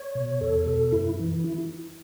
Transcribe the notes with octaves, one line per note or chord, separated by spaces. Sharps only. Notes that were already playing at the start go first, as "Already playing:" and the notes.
Already playing: C#5
B2
E2 A4
B2 A4
F#2 E4
E3
E4